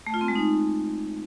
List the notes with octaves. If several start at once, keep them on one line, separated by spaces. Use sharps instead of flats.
A3
F4
C4
G#3
D#4